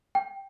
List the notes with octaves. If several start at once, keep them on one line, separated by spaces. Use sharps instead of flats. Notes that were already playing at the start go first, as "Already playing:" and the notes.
G5